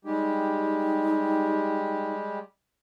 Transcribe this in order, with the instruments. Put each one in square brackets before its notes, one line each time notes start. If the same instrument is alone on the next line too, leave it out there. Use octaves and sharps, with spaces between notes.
[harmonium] G3 G#3 G4 [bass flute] D#4